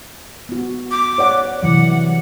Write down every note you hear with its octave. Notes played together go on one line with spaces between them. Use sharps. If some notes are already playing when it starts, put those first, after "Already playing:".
B3 F#4
D6
C#5 D5 F#5
C3 E3 F#3 F#5